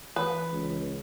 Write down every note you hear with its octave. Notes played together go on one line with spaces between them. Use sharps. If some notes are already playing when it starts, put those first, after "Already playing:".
E3 B4
C#2